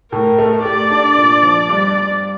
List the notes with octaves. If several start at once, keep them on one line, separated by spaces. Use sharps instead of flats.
A2 A#4
A3
G4 D5
D4
A#2
F3
G2
G2